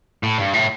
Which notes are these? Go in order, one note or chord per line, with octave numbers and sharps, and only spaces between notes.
A2
G2
A2